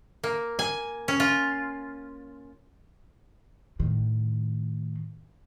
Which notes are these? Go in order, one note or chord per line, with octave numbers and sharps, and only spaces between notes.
A#3
G#5
C#4
F4
A2 D#3